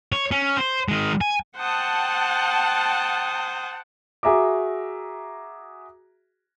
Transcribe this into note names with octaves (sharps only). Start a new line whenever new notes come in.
C#5
C#4
C5
D#3 G#3
G#5
C5 F#5 G5 A5 D#6
F#4 G#4 E5 A#5 D6